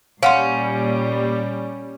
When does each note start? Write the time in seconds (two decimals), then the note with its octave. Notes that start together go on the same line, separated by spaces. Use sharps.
0.23 A#2 G3 C#4 F5 F#5 C6